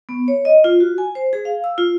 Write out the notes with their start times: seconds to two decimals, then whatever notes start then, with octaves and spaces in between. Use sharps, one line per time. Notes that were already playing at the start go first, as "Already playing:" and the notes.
0.09 B3
0.28 C#5
0.45 D#5
0.64 F4
0.80 F#4
0.98 G#5
1.15 C5
1.33 G#4
1.45 F5
1.64 E6
1.78 F4